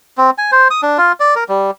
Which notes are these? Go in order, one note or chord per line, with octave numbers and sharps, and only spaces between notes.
C4
G#5
C5
D#6
D4
F4
D5
A#4
G3